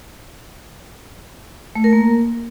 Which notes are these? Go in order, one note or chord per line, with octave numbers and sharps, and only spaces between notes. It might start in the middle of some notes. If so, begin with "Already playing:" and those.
A3
A#4
A#3